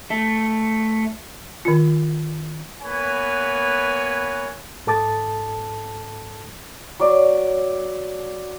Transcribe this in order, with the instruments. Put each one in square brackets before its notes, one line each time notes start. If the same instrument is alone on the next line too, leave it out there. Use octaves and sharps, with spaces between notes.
[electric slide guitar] A3
[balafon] D#3 F4
[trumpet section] A#3 B3 B4 C#5 G#5
[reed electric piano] G#2 A4 A5 D6 D#6 A6
[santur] F#3 D5